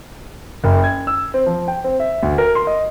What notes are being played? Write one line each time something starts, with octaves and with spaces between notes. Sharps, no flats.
F#1
G#6
E6
C4
F3
G5
C4
E5
D2
A#4
C6
D#5